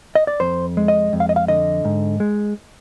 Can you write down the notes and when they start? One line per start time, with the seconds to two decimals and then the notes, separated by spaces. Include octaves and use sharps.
0.15 D#5
0.27 D5
0.40 F2 C5
0.77 G#3
0.88 D#5
1.13 F2
1.20 F5
1.29 D#5
1.36 F5
1.48 D3 D#5
1.85 G#2
2.20 G#3